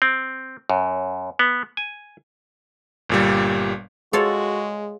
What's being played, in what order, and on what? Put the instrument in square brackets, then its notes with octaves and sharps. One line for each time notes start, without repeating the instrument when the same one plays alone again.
[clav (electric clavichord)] C4
F#2
B3
G#5
[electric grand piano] G1 A#2 G3
[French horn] G#3 [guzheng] F4 A4 C#5 [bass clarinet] F#4 [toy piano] G#4